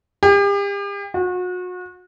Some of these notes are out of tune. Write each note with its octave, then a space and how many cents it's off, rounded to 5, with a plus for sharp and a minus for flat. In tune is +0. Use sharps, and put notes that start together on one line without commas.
G4 +40
F#4 -35